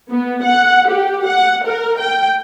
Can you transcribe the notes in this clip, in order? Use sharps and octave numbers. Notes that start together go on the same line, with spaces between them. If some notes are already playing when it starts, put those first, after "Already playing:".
B3
F#5
G4
F#5
A#4
G5